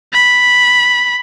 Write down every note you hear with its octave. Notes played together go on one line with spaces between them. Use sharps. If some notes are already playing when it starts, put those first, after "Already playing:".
B5